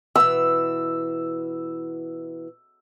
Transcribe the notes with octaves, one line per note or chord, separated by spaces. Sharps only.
B2 E3 E6